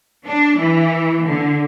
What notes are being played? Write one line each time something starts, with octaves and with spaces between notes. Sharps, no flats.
D4
E3
D3